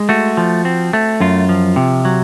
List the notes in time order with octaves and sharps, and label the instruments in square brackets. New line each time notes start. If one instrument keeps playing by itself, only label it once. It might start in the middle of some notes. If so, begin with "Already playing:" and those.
Already playing: [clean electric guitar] G#3
A3 F#4
F3
C4
A3
F#2 F4
F3
C3
F#3